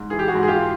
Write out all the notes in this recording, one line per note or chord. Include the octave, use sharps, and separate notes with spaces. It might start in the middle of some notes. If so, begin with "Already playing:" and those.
Already playing: G#2
E3 G#4
G4
F#4 G#4
G#2
G#4
F4 G4